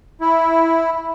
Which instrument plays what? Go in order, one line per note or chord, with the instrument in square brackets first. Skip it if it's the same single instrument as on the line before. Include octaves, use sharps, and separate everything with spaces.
[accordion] E4